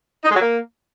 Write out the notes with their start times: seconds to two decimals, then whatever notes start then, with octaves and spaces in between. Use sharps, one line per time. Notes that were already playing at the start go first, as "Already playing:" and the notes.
0.24 D#4
0.29 G#3
0.35 F#3
0.41 A#3